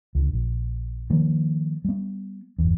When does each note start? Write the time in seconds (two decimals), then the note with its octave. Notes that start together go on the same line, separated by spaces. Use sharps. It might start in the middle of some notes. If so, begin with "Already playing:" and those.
0.15 C#2 D3
0.33 A#1
1.10 D#3 F3 A#3
1.85 G3 B3
2.58 G1 E2